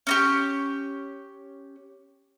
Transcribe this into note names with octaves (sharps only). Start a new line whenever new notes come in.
C#4 D#4 G4